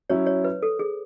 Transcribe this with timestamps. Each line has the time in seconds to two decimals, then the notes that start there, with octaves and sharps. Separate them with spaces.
0.10 F#3 C#4 E4 C#5
0.26 C#5
0.44 B4
0.63 A4
0.79 G#4